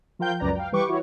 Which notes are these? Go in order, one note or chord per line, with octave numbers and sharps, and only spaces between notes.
F3 F4 A#4 F5 G5 G6
C#2 F#2 B4 D5 A#5
F5 G5
E3 G3 B4 G5 C#6 D6
E4 F#4 C#5